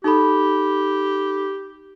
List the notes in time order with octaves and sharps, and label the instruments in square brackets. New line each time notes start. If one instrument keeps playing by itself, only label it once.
[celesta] D#4 A4 B5 [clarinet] G4